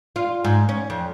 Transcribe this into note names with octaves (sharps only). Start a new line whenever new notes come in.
F4
G#2
C#4
F2